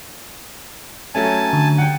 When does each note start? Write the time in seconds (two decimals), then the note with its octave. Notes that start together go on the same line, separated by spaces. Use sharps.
1.15 F#3 A3 C#4 G#5 A5
1.53 D3
1.78 F#5 G5